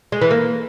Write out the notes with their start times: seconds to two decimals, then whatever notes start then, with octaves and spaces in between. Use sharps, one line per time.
0.12 G#3
0.21 E3
0.31 A#3